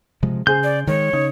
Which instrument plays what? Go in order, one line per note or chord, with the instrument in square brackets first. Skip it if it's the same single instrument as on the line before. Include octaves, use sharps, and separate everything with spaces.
[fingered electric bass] C3 F3 G#3
[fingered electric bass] C#3 [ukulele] G#4 C5 [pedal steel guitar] G6
[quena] D5
[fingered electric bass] D#3 G#3 [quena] C#5
[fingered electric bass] C#3 [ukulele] D#4